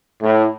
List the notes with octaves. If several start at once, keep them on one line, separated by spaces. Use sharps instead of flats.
A2